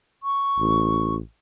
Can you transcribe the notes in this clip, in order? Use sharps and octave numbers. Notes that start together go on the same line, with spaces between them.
C#6
A1